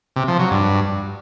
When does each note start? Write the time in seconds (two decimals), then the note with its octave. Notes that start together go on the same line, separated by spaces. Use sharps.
0.16 C3
0.28 F3
0.39 F#3
0.51 G2